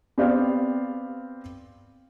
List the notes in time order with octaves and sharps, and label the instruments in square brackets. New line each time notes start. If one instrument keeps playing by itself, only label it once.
[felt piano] B3 C4 G4 C5 D5 F5